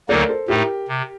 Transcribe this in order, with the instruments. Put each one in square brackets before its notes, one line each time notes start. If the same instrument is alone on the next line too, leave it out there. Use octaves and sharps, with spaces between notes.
[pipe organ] D2 D3 F#3 A#3 D#4 [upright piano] A#4 D5
[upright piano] A4 C5
[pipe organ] A2 A3 D#4 [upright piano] G4 A#4
[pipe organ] C3